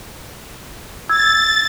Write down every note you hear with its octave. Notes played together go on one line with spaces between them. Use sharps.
E6 G#6 A6